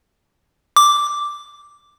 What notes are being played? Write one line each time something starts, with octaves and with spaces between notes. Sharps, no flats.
D6